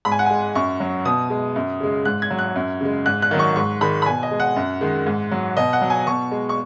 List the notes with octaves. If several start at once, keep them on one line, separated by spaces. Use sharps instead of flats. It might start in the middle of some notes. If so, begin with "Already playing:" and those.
G#2 B5
G#5
F#5
G#3 G#5
F#2 C#6
F#3
B2 D#6
G#3
F#2
C#3 G#3
G#2 F#6
G#6
F#3
F#6
F#2
C#3 G#3
G#2 F#6
F#6
D#3 F#3
C#6
G#2 C#6
D#3 G#3 B5
B5
B2 G#5
D#5
G#3
F#5
F#2
D#3 G#3
G#2
F#3
B2 D#5
F#5
F#3
G#5
B2 C#6
G#3
C#6